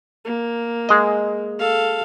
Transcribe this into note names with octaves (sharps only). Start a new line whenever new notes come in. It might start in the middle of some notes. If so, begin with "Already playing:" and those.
A#3
G#3 D#5
A4 F5